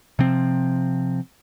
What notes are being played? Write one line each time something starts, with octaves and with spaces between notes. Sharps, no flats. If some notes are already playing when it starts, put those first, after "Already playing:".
C3 F3 C4